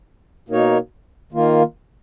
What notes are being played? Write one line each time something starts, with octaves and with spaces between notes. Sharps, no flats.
B2 A#3 D#4 A#4 C#5
D#3 A#3 F4